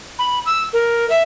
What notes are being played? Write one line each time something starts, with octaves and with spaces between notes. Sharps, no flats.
B5
E6
A#4
E5